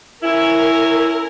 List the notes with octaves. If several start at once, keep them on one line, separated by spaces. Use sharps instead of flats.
C#4 E4 A#4